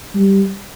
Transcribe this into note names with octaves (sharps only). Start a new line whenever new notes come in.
G3